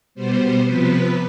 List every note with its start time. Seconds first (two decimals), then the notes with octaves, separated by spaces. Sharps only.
0.15 B2 G3 B3 C5
0.64 C3 F3 B3 B4